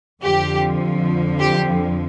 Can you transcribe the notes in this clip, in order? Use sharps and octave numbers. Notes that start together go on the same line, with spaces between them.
F2 D3 F3 G4
G4